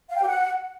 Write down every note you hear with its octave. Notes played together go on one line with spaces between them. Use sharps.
F5
G5
G4
F#5